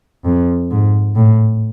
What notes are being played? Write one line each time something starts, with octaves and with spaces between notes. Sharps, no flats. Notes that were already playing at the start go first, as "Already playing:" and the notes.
F2
G#2
A2